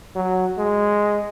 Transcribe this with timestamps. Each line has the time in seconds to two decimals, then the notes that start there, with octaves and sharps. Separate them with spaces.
0.16 F#3
0.58 G#3